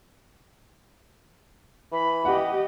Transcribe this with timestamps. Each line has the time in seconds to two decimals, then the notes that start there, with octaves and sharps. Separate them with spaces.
1.92 E3 B5
2.25 G4 D#5 F#5